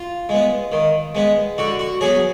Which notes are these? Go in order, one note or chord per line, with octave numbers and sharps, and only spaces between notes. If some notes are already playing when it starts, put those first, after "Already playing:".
Already playing: F4
G#3 B3
D#3
G#3 B3
D3 F#4
F#4
F#3 B3 G#4